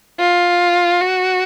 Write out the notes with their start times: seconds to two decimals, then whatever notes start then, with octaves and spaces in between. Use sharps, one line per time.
0.19 F4
1.01 F#4